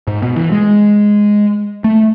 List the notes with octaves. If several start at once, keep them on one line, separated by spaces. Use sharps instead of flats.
G#2
B2
E3
G#3
A3